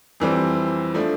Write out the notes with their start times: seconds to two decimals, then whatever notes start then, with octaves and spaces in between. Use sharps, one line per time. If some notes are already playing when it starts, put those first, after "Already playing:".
0.20 F2 E3 G3 C4
0.94 F3 A3 D4